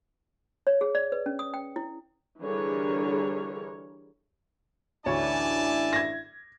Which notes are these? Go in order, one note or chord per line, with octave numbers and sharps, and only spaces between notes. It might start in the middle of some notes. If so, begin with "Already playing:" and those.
C#5
G#4
D5
B4
C#4
D#6
G5
E4
D3 E3 G3 G#4 A#4 C#5
A1 D2 D4 E4 C#5 D5 G#5 A5
G#6 A#6